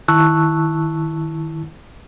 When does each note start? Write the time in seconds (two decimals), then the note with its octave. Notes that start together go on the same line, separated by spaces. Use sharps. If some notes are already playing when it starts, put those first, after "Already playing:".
0.08 D#3 E4 A5 C#6 E6 F#6